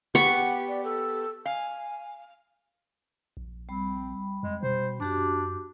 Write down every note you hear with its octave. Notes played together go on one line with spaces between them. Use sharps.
B3 G4 F#5 C#6
D5
A4
F5 G#5
A#1
G3 C4 B5
F2 G#3
B2 C5
F#2 D4 F#4 G4 D6